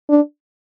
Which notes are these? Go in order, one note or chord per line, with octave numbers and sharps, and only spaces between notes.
D4